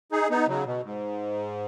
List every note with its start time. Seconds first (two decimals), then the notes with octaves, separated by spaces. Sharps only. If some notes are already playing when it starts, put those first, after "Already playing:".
0.12 D#4 G#4
0.30 B3 D#4
0.48 C#3 F#3
0.65 B2
0.83 G#2